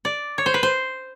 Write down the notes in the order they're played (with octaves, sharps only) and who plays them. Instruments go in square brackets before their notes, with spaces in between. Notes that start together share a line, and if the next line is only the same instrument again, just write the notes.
[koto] D5
C#5
C5
B4
C5